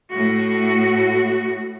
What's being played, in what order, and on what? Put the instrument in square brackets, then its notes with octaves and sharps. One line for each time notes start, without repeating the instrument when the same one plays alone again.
[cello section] A2 A3 F#4